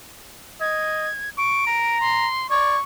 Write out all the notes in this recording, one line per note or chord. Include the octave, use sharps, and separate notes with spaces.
D#5 G#6
C#6 D7
A#5
C6
D5 C#6 G#6